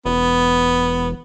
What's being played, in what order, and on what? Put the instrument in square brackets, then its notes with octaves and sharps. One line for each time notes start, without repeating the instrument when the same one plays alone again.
[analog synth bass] E1 [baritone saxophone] B3